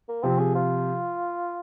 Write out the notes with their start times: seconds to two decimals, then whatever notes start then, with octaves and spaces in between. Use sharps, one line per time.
0.08 A#3
0.23 C3 F3 C4
0.39 G#4
0.55 F4